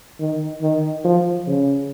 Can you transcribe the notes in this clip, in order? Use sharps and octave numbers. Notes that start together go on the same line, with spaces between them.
D#3
D#3
F3
C#3